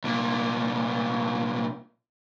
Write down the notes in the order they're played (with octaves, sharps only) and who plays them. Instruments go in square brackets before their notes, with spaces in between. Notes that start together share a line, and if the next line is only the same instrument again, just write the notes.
[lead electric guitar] C2 A#2